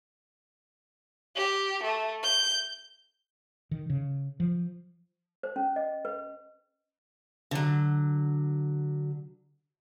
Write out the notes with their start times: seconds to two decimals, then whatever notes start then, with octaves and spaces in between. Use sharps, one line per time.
1.36 G4
1.84 A3
2.23 G6
3.71 D#3
3.90 C#3
4.40 F3
5.43 C5
5.56 C#4
5.76 D#5
6.05 B4
7.51 D3 F#3